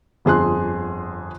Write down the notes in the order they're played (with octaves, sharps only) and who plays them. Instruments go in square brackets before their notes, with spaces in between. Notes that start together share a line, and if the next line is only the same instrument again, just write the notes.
[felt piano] G1 F2 G#4 C6 F#6